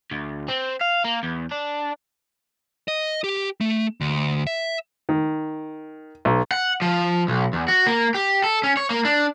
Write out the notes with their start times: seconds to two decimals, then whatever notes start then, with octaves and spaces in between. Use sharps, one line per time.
0.12 D2
0.48 C4
0.81 F5
1.04 A#3
1.23 E2
1.51 D4
2.88 D#5
3.24 G4
3.61 A3
4.01 D2
4.47 E5
5.09 D#3
6.25 B1
6.51 F#5
6.82 F3
7.28 B1
7.53 E2
7.68 F#4
7.86 A#3
8.15 G4
8.44 A4
8.63 C#4
8.77 C#5
8.90 A#3
9.05 D4